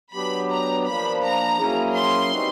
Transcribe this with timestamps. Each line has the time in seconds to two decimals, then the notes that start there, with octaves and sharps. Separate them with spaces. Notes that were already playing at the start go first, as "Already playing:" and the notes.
0.13 F#3 B3 D4 G4 B5
0.50 A#5
0.86 F3 A#3 D4 B5
1.23 A#5
1.59 F#3 A#3 C#4 E4 G#4
1.96 C6
2.31 G3 C4 D#4 F#4 B4